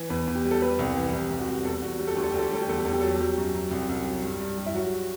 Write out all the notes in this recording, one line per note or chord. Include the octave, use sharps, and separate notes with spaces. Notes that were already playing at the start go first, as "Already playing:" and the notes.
Already playing: E3
E2 B4
E2
G4
G3
A4
G3 B4
C2
E3
C2 G4
C2
F#4
G3
E2 A4
E2 F#4
G3 G4
A4
D2 G4
A4
G4
D2 A4
G4
G3 A4
G4
E2 A4
G4
E2 A4
G4
F#3 A4
G4
F#3 G4
F#2
F#2
C2
C2
F#3
G2
G2
G3
E4
F#3 F#4